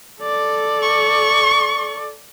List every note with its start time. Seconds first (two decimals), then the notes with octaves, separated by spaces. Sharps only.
0.22 A4 D5
0.82 C#6